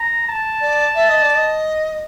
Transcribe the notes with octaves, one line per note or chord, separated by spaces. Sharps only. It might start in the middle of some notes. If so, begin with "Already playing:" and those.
Already playing: A#5
A5
D5
E5
D#5
D5
D#5